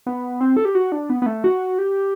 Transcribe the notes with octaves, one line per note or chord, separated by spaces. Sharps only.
B3
C4
A4
G4
F#4
D4
B3
B3
A3
F#4
G4